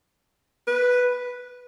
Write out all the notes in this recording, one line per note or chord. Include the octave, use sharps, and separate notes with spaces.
B4